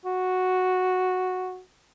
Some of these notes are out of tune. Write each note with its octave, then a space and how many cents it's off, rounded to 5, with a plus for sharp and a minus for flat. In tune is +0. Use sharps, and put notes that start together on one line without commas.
F#4 -5